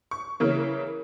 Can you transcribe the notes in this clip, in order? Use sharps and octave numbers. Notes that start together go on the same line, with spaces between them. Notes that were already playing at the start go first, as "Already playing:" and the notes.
C#6
C#3 E3 A#3